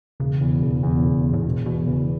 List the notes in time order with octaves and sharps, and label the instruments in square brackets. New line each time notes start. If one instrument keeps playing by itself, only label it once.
[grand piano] E1 [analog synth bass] C#3
[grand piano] E2
E1
E2
E1
E2
[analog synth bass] A2
[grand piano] E1 [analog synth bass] B2
[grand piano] E2 [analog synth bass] B2
[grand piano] E2 [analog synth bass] C#3